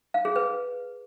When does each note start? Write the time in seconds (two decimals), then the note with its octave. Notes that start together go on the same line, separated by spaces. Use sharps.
0.14 F5
0.25 G#4
0.36 B4